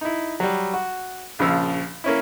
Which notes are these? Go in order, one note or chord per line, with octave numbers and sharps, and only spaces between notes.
D#4 E4
F#3 G3
F#4
A#1 C#3 F3 E6
A#3 C#4 E4